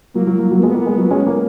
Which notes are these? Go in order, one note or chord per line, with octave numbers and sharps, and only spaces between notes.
F#3 A#3
F#3
F#3
F#3
G#3 B3
A#3
G#3
F#3
G#3 C#4
A#3